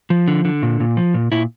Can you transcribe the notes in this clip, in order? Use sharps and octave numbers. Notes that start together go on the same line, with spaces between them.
F3
D3
D3
A#2
A#2
F3
A#2
A#2 E4